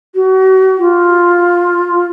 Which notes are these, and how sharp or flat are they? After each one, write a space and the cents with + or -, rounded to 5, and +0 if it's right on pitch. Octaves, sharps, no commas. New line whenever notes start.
F#4 +35
F4 +5